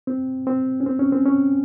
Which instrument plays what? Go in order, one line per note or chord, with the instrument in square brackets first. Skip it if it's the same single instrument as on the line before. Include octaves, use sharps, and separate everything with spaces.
[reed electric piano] C4
C4
C#4
C4
C#4
C4
C#4